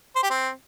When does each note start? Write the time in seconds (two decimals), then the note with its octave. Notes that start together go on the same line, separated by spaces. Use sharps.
0.15 C5
0.23 G4
0.30 C4